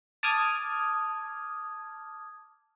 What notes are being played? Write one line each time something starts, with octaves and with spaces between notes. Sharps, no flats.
A5 D6 D#6 F6 G#6